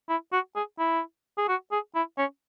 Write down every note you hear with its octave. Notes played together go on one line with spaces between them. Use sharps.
E4
F#4
G#4
E4
G#4
F#4
G#4
E4
C#4